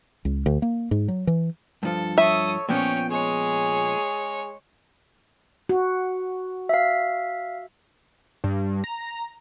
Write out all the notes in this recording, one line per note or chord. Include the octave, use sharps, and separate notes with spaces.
C#2
D2
A#3
G#2
F#3
E3
G2 F3 A4
A4 C#5 E5 D#6
A#2 F3 B3 C#4 C#5 G5
G#3 G#4 C#5
F#4
E5 F5
G2
A#5